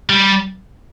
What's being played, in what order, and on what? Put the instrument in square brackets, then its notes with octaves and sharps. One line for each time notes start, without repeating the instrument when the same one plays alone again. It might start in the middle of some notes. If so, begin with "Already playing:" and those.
[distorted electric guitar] G3